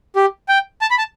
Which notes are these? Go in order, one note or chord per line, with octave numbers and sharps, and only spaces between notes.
G4
G5
A5
B5
A5